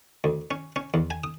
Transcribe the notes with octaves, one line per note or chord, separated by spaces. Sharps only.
D2
C#4
C#4
E2
G#5
D#6